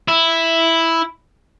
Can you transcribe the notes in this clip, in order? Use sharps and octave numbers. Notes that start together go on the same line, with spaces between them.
E4